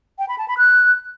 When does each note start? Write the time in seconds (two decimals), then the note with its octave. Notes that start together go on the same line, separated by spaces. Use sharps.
0.19 G5
0.29 B5
0.38 A5
0.48 B5
0.58 F#6